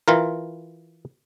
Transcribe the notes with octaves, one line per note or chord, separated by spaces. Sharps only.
E3 F4 A#4